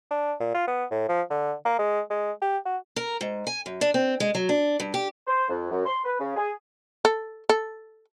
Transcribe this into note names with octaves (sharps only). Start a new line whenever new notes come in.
D4
A#2
F4
B3
A2
F3
D3
A#3
G#3
G#3
G4
F#4
A#4
G#2
G#5
F#2
D4
C4
G#3
F#3
D4
G2
G4
C5
F2
F#2
C6
B4
C#3
G#4
A4
A4